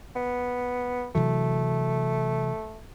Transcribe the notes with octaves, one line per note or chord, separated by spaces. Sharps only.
B3
C3 E3 F#3 A3